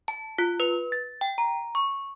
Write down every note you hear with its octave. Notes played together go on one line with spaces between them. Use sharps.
A5
F4
B4
A6
G5
A#5
C#6